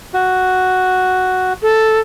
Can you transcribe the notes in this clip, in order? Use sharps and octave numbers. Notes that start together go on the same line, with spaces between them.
F#4
A4